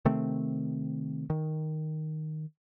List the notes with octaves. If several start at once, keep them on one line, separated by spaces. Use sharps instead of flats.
C3 D#3 A3 C4
D#3